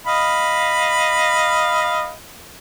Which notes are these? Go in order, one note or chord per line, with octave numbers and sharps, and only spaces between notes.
D#5 F5 B5